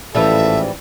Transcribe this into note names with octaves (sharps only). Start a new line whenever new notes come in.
A1 G#2 E3 F3 G3 A4 E5